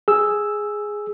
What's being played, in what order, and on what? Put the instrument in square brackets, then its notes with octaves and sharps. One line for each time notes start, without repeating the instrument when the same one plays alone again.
[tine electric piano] G#4 E6